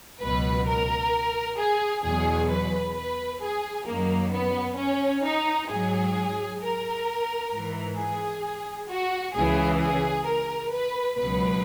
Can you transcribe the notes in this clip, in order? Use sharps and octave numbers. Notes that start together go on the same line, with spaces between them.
C#2 B2 F#3 B4
A#4
G#4
E2 B2 F#3 G#4
B4
B4
G#4
F#2 D#3 F#3 A#3
B3
C#4
D#4
G#2 F#3 G#4
A#4
G#2 E3
G#4
F#4
C#2 C#3 E3 G#4
G#4
A#4
B4
C#2 B2 F#3 B4